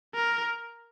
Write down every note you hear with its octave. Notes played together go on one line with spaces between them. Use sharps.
A#4